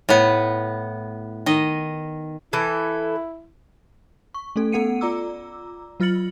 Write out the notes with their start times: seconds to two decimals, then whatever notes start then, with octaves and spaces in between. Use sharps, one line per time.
0.09 A2 B3
1.46 D#3 D#5
2.53 E3 E4 A4
4.34 C#6
4.56 A3 C#4 A4
4.72 B3 A4 F#5 C#7 D#7
5.01 F4 D5 A#5 D6 E6
6.00 F#3 F4 F6 A6 C#7 F#7